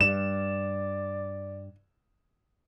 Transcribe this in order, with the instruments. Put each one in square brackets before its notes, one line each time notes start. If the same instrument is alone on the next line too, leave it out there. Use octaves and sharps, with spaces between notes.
[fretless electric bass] G2 [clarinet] D5 [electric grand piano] E7